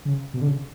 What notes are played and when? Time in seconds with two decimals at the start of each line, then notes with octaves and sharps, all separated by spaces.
0.05 C#3
0.34 B2
0.41 D3
0.47 C#3